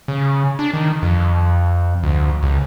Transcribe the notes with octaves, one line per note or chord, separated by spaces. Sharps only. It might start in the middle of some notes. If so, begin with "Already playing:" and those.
C#3
D4
D#3
F2
D2
C#2